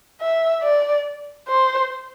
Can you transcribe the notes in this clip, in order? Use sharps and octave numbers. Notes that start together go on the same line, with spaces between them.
E5
D5
C5